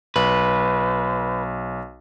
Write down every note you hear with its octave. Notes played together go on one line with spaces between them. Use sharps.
B1 B4